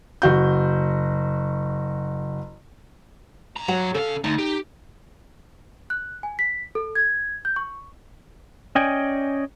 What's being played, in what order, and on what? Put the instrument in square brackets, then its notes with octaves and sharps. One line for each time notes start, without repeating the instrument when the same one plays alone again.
[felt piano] F#1 F#4 G6
[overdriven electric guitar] G2 A#5
[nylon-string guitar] F#3 F#4 F#5
[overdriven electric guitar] C#3 F5 [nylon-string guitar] A4
[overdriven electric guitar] D2 [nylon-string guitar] D#4
[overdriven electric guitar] G4
[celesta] F#6
G#5
B6
A4
G#6
G6
C#6
[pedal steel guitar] C#4 D5 D#5 G5 G#5